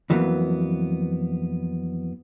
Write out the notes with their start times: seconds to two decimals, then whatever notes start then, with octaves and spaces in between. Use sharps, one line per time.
0.10 F2 E3 F#3 A#3 B3